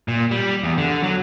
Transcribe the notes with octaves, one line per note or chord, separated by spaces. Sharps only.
A#2
G3
E2
D3
F#3